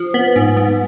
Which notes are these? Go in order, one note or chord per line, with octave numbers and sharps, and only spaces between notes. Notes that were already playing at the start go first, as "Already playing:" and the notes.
Already playing: F3
B3
G#2
G#2